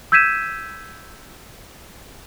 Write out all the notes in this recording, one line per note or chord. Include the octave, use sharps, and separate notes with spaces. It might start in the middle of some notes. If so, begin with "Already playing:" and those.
E6 G6 G#6 B6 D#7 E7